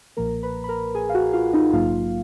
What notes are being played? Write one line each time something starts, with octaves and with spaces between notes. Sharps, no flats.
B1 A#2 F3 A#3 A#4 A#5
B4 B5
B5
A#4 A#5
G#4 G#5
F5
F#4 F#5
F4 F5
D#4 D#5
A#1 G#2 F#3 A#3 F4 F5